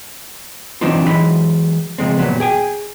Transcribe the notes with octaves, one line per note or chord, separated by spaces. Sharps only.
E3 F#3 C4 D4 D#4 F4
E3 F#3 G#3 B5
C#3 F3 G#3 C4
D#2 A#2 F3 F#3 B3
G#4 G5 G#5